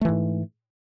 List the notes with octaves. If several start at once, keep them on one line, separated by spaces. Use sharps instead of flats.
G#2 E3 A3